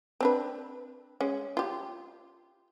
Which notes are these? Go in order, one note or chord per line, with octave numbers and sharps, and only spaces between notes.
C4 D4 B4
G#3 C#4
F4 G4